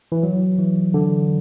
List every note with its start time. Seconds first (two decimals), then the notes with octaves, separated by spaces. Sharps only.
0.12 E3
0.23 F#3
0.59 E3
0.94 D3